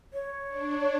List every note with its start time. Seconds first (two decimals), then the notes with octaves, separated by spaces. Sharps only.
0.13 C#5
0.48 D4